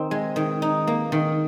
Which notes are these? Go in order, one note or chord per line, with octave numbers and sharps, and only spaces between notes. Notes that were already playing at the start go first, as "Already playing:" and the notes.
Already playing: D#3 C4 D#4
G#3
D#3
D#4
A#3
D#3